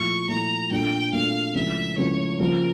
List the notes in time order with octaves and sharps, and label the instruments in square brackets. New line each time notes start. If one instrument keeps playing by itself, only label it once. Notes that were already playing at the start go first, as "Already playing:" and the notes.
Already playing: [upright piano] A#2 F3 A3 E4 [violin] C#6
[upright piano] A#2 F3 A3 E4 [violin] A#5
[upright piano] A#2 A3 D4 A4 [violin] G5
[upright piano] A#2 A3 D4 A4 [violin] F5
[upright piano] C#2 C#3 F3 A3 E4 [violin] E5
[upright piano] C#2 C#3 F3 A3 E4 [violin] C#5
[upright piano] C#3 F3 A#3 [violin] A#4